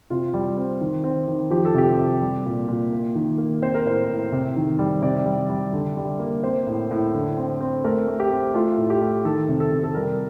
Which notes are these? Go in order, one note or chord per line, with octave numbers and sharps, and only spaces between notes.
C3 F4
G3
C4
D#3
C4
D#3
F3 G4
A4
C3 G4
C3
G3
A#2
A#2
A#3
D#3
A#3
C4 C5
A#4
A2 C5
A2
C3
D#3
G3
C3 D5
G3
G3
D3
G3
A#3
C4 C5
A2
A2
D3
C4
C4
A3 A#4
A3
G4
C4
A3 F4
A2
G4
A3
D#3 A4
C3
A4
C3
A4
G3 A#4